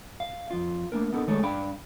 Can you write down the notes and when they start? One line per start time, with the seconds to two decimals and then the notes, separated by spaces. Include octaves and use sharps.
0.20 F5
0.51 F2 F4
0.92 A3 A#3 C4 D4 A#4
1.13 B3 D4 D#4 A4 A#4
1.27 D#3 G#3 A3 G#4 A4 C#5
1.43 G2 D4 F5 G5 B5